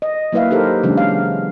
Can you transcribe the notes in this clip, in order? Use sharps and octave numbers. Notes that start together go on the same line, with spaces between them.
D#5
F#3 A#3 E4 B4 E5 F5
D#4 G4 A4 A#4 C5
C#3 E3 F#3 G#3 C#4 D4
F5